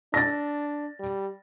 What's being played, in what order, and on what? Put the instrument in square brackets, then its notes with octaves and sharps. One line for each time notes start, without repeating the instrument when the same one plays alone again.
[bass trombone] D4 [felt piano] A6 A#6
[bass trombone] G3